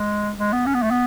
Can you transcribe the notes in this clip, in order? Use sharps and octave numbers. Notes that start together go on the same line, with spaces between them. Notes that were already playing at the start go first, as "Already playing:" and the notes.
Already playing: G#3
G#3
B3
C#4
B3
A3
B3